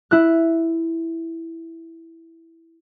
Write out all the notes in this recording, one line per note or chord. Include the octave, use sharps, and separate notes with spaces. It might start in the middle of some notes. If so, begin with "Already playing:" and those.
E4 F#6